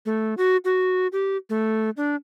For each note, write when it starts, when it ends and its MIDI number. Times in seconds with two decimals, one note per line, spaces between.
0.06 0.34 57
0.38 0.57 66
0.65 1.07 66
1.12 1.37 67
1.50 1.90 57
1.97 2.16 62